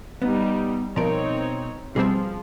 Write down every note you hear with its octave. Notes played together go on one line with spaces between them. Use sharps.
G3 B3 D#4
B2 F3 C4 D#4 A#4 C#5 D5
B2 F3 G3 C4 G#4 A5